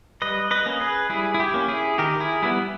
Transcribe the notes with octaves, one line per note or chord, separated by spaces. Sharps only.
G3 B4 D#5
B4 D#5
A#3 C#4
G#4 B4
G3 E4 G#4
E4
G4
A#3 C#4
E4 G#4
D#3 G4 A#4
E4 G#4
G3 B3 E4